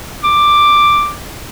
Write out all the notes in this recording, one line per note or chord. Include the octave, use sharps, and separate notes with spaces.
D6